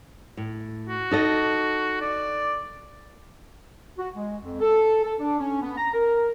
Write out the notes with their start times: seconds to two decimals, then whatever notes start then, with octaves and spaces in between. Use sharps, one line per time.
0.37 A2
0.89 F#4
1.11 D#4 A4 D#5
2.02 D5
3.99 F#4
4.15 G#3
4.42 F2
4.60 A4
5.04 A4
5.20 D4
5.39 C#4
5.62 B3
5.77 A#5
5.94 A#4